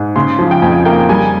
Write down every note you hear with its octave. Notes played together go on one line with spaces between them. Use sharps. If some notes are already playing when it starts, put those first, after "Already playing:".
Already playing: G#2
C#3 C6
F3
G5
F2 G#5
A#3 G5
G3 G#5